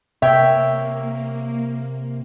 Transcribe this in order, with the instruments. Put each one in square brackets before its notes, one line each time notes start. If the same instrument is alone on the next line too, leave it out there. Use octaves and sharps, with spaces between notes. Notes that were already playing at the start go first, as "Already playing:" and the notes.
[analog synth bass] C3 [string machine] A#3 [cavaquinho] C#5 G5 [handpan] E5